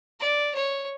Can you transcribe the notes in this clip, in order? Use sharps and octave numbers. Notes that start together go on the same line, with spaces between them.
D5
C#5